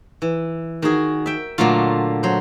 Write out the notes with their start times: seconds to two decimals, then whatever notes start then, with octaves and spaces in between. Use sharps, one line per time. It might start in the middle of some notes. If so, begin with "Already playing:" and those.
0.22 E3
0.82 D#3 F#4 G#4
1.26 E5 G5
1.58 A#2 D3 F#3 A3 F4
2.23 F#3 C5